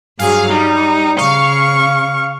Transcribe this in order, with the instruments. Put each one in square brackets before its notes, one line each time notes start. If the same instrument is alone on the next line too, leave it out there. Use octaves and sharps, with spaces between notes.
[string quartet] G2 F#3 G#4 [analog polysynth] F5
[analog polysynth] G3 [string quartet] D#4
[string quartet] C#3 C#6 [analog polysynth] F5